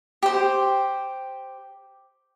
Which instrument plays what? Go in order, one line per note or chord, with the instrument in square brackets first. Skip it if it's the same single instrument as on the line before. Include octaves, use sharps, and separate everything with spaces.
[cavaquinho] G4 C5